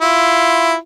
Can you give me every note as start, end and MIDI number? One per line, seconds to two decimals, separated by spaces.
0.01 0.75 64
0.01 0.75 65